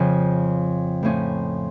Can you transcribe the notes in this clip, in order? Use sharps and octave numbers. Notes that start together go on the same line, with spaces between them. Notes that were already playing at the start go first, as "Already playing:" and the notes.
Already playing: F2 C#3 F3
A2 F3 C#4